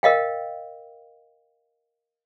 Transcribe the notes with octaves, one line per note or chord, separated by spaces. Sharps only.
A#4 D#5 F5 G5